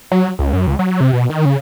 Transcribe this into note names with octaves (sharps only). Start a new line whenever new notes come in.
F#3
C#2
F#2
C#2
F#3
C3
B2
D#3
C#3